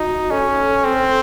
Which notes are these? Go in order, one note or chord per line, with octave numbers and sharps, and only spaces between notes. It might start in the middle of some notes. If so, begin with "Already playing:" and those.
Already playing: D#4 F#4
C#4 A4
C4